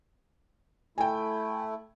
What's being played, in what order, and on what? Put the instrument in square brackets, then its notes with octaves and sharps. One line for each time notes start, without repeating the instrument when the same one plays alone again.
[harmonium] A3 E4 [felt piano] G5 G#5